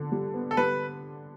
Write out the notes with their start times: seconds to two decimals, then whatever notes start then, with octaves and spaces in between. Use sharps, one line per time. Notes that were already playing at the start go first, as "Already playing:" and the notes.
Already playing: D3
0.12 G3
0.34 B3
0.51 A4
0.57 G3 B4